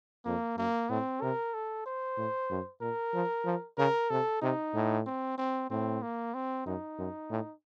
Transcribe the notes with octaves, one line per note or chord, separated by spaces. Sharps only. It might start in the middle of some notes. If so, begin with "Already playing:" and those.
F2 A#3
F#2 A#3
A2 C4
C3 A#4
A4
C5
A2
F#2
A#2 A#4
F3
F3
C#3 A#4
C3 A4
C3 D#4
A2
C4
C4
A2 C4
A#3
C4
F#2 D#4
F#2
A2